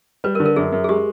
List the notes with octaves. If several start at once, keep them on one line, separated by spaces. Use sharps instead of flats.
G3 B4
A#4
D3
A#4
F#2 G#4
F#2
G#4
G#3 G4